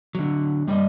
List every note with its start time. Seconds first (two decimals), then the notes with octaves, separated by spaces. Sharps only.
0.15 D3 F#3
0.67 G2 G3 D5 D#5